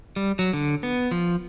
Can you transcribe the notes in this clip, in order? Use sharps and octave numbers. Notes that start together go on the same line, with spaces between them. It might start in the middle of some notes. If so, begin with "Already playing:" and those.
G3
F#3
D3
B3
F3